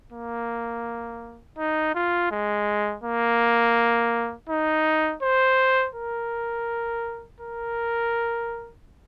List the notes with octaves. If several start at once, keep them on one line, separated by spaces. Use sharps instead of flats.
A#3
D#4
F4
G#3
A#3
D#4
C5
A#4
A#4